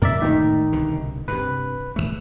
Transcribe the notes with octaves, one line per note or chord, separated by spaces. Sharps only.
F#2 B2 D#3 A#4 D5 E5
A2 D#3 A3 A#3 D#4
C2 B2 D3
G2 C3 B4
E1 F2 A3